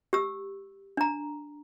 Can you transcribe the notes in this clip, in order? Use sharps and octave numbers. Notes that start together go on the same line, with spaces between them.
G4 E6
D4 A#5